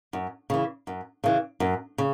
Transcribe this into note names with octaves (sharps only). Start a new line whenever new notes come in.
F#2
C#3 E3
F#2
C#3 E3
F#2
C#3